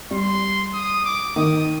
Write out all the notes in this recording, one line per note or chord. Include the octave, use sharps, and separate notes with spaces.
G3 C6
D#6
D6
D#3 D#6